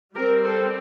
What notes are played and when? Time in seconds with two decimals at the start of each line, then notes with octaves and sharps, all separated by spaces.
0.15 G3 G4 A#4
0.19 C4
0.43 A4 C5